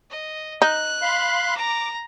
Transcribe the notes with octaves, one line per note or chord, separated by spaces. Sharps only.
D#5
D#4 F#6
F5 B5 C6
A#5 D6